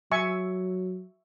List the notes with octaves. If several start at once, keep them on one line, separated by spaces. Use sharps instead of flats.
F#3 E5 G#5 C#6